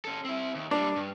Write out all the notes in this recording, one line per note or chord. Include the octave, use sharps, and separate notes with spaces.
C#4 A4
C4 E4
D#2
G3 A#3 D4
G2